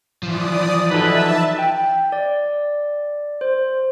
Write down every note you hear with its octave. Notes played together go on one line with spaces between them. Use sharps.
E3 F3 D5 D#6
D#4 F#4 A4 B4 E5 A5
G5
D5
C5